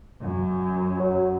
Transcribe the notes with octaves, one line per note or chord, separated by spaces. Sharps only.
F#2
F#3